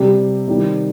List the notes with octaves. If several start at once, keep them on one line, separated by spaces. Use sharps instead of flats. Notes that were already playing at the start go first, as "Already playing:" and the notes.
Already playing: C3 G3 G4
C3 D#3 G3